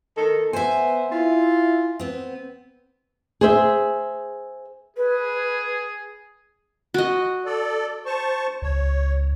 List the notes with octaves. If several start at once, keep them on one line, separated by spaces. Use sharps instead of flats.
D#3 A4
B3 C5 E5 G#5
E4 F4
B3 C4
G#4 C5 E5
G#4 B4
F#4 D#5
A4 D5
C5 A5 C#6
C#2 C#5